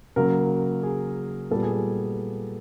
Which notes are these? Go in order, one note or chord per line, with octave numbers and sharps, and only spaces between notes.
C#3 F#3 A#3 A#4
G#4
A#2 G3 B3 A4
G#4
G#4